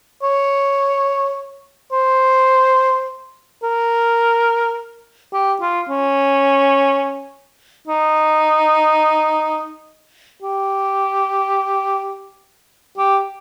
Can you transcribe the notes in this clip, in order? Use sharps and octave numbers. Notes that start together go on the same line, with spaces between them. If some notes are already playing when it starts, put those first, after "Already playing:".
C#5
C5
A#4
G4
F4
C#4
D#4
G4
G4